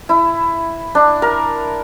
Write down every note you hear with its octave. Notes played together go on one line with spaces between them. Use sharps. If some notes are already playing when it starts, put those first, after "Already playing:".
E4
D4
A#4